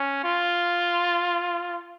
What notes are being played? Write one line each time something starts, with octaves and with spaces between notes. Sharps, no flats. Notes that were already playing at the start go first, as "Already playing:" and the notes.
Already playing: C#4
F4